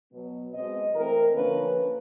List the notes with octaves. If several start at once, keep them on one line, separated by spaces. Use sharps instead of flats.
B2 F#3 B3
B2 G#3 C4 D#5
E3 A3 C4 A#4
D3 F3 A#3 C#4 B4